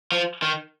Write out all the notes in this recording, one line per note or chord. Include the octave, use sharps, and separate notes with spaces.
F3
D#3